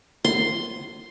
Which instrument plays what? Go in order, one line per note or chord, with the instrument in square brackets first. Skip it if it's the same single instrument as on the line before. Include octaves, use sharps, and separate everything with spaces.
[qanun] C6